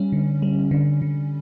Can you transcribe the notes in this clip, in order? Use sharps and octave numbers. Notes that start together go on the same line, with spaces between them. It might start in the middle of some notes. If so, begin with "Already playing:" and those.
Already playing: G3 C#4
D3
G3
D3
D3